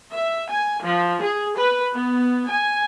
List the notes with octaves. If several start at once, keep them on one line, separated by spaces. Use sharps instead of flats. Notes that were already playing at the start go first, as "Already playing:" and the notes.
E5
G#5
F3
G#4
B4
B3
G#5